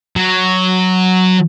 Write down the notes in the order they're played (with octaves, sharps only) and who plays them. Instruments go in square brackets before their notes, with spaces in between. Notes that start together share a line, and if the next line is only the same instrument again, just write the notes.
[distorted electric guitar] F#3